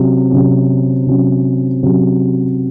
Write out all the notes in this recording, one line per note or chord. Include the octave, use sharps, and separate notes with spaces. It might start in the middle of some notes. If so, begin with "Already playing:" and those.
Already playing: C3 F#3 C#4
C3 F#3 C#4
C3 F#3 C#4
C3 F#3 C#4